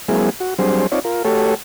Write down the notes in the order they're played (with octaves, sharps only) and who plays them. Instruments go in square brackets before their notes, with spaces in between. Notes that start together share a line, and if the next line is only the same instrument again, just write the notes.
[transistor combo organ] F#3 G#3 A#3 C4 E4 G#4
F#4
F#3 G3 C4 D4 G#4 C5
C4 D#4 F4 C#5 D5
F4 A#4
A3 F#4 G4 A4 C#5